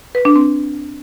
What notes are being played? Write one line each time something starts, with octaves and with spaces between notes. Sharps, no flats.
B4
D4
C4